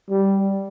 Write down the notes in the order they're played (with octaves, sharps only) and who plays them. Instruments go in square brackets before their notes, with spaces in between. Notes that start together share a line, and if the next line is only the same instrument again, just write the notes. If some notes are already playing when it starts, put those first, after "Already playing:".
[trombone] G3